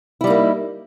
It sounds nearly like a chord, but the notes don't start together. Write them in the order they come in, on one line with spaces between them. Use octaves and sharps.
E4 G3 D#4 A#3